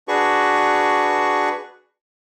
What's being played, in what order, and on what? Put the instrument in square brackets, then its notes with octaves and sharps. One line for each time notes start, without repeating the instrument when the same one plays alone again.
[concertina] D4 F#4 G#4 B4 C#6